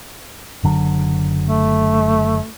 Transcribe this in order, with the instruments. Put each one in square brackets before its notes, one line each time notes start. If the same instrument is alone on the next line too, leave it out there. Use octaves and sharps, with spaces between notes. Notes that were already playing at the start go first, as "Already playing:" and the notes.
[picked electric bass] F#1 D3 F#3
[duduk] A3